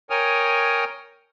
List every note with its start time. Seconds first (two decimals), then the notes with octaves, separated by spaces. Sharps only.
0.10 A#4 C#5 G5 G#5 D#6 F6